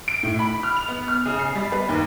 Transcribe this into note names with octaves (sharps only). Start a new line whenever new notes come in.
D7
A2
B5
F6
F7
B3
F6
C#3
C7
G3
B4
D#2